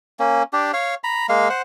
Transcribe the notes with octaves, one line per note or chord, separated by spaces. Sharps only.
A#3 C#4
D4 G4
C#5 F5
A#5 B5
G#3 A#3 F5
C5 F#5